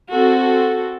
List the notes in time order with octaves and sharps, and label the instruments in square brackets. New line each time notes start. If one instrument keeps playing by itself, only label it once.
[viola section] C4 F#4 A4